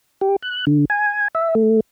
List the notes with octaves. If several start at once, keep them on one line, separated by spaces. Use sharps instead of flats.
G4
F#6
D3
G#5
E5
A3